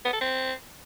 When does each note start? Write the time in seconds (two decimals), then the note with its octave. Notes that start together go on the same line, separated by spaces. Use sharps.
0.05 B3
0.13 A4
0.21 C4